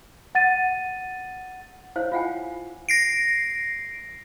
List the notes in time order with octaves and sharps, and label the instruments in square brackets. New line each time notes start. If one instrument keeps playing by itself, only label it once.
[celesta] F#5 A6 D#7
[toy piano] E4 C5 C#5 F5
F4 F5 F#5 G#5
[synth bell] A#6 C7 D7